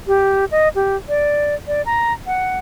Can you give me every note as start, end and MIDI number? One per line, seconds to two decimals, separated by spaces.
0.07 0.45 67
0.51 0.68 75
0.75 0.96 67
1.09 1.55 74
1.68 1.84 74
1.86 2.13 82
2.27 2.59 78